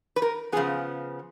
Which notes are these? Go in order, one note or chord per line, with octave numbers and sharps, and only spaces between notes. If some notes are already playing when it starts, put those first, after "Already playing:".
B4
A#4
C#3 F3 B3 G#4